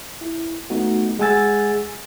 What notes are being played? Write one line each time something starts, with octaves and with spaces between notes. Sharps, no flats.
E4
A3 B3 D#4 F#4
G#3 G#4 F#5 G#5 E6 A6